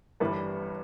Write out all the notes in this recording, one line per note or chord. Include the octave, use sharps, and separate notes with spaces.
G1 G2 E3 G3 B4